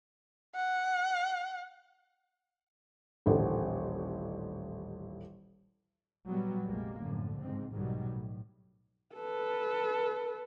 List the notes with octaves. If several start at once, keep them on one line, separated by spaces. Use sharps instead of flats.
F#5
D#1 A1 D3 D#3
A#2 F#3 G3 B3
F1 A#1 C3 G3 G#3 A#3
F#2 A2 D3 F3
C#2 G#2 C4
B1 G#2 B2 D#3 F#3 G3
A2
A4 B4